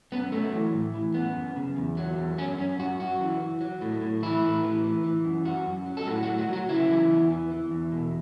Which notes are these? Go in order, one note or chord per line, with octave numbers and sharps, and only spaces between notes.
F#2 B3
F#3 A3
E3
A2
E3
F#2 B3
F#2
C#3
E2
F#3
E2
F#2 C#4
F#2 C#4
F#2 F#4
F#2 F#4
E3
E3
F#3
A2
A2
E3 E4
A2
E3
E3
E3
F#2
F#2 F#4
F#2
F#3
A4
A2 F#4
F#4
F#3
F#4
F#3 F#4
C#3 E4
E3
E2
E3
E3
E2
B2